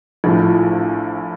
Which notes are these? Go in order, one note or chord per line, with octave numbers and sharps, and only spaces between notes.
A#1 A2 F3